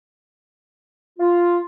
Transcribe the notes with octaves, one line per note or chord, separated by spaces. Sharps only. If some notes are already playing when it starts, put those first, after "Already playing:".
F4